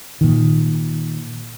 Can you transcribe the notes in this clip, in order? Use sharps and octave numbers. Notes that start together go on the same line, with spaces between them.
A#2 D#3